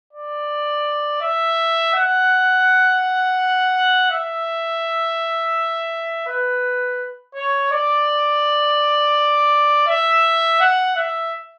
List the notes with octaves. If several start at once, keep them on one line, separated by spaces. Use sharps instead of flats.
D5
E5
F#5
E5
B4
C#5
D5
E5
F#5
E5